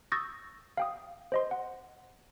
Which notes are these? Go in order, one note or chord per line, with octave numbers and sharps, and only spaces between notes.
C#6 D#6 E6 G6 A6 A#6
F5 G5 D#6
C5 D#5 C6
F#5